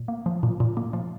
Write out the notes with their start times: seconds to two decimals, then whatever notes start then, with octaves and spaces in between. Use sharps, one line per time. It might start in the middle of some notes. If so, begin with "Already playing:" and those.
Already playing: A#2
0.08 A#3
0.26 F3
0.43 A#2
0.60 A#2
0.77 A#3
0.93 F3